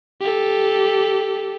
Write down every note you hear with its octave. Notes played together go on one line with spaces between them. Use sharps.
G4 A4